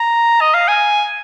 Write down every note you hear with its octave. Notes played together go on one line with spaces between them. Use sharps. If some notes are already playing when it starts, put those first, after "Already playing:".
Already playing: A#5
D#5
F5
G#5